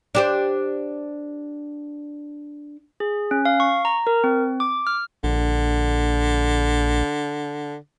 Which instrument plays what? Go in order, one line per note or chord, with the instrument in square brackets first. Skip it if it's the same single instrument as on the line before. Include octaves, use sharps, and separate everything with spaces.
[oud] D4 G4 C5
[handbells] G#4
C#4
F5
C#6
A#5
A#4
C4
D6
F6
[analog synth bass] A#1 [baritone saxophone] D3